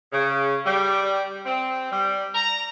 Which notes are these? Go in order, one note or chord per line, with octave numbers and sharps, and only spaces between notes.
C#3
G3
C4
G3
A#5